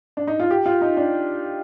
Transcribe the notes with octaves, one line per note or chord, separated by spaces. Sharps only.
D4
D#4
F4
G4
F4
D#4
D4